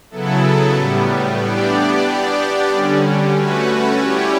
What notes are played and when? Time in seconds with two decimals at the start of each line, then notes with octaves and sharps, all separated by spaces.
0.11 C#3 F#3 B3 E4 A4
0.75 A2 G3 B3
1.40 E3 B3 D4 G4 D5
2.04 B3 D4 G4 D5
2.69 D3 G3 C#4
3.33 A3 C#4 F#4 B4
3.98 G3 C#4 E4 G4 C#5